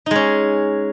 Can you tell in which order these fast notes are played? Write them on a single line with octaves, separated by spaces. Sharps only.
D#4 G#3 C#4